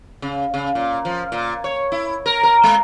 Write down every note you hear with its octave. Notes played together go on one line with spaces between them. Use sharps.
C#3
C#3
A#2
F3
A#2
C#5
E4
A#4
A#4
G#3